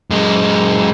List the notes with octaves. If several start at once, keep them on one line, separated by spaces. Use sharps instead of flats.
F#2 G#3